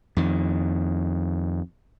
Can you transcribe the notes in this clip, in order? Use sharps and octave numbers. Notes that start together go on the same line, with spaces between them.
F2 D#3